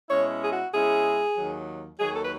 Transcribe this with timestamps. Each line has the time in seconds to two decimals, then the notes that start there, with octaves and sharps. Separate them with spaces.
0.09 B2 G#3 C#4 E4 C#5
0.43 G#4
0.51 F#4
0.73 B2 G#3 C#4 E4 G#4
1.36 D#2 D#3 F#3
2.00 D#2 D#3 F#3 G#4
2.15 A4
2.24 B4